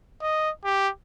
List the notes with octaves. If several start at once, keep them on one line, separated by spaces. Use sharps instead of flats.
D#5
G4